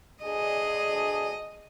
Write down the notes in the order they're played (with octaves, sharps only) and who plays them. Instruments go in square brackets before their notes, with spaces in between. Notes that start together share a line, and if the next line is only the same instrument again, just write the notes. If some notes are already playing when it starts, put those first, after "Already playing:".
[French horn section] D2 D4 G#4 [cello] D#5